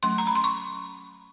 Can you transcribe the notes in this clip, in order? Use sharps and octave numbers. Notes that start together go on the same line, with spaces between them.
F#3 A3 C#4 C6
A#5
B5
C6
C#6